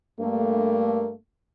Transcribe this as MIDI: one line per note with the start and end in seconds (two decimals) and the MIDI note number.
0.20 1.13 43
0.20 1.13 57
0.20 1.13 58